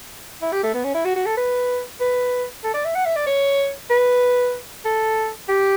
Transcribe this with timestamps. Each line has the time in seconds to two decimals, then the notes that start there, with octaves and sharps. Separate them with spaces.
0.42 E4
0.52 G4
0.63 A3
0.74 B3
0.84 C#4
0.94 E4
1.05 F#4
1.16 F#4
1.26 A4
1.37 B4
2.00 B4
2.64 A4
2.74 D5
2.85 E5
2.95 F#5
3.06 E5
3.16 D5
3.27 C#5
3.90 B4
4.85 A4
5.49 G4